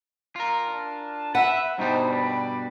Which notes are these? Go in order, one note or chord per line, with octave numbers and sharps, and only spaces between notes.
F4 A#4
D4 A5
B4 E5 F#5
G2 B2 G3 D#4 C5
B4 D5